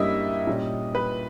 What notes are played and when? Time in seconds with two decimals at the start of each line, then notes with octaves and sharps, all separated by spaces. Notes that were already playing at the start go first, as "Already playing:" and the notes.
Already playing: G2 G3 A#3 C#4 E4 D#5 E5
0.47 A#2 G3 C#4
0.95 B4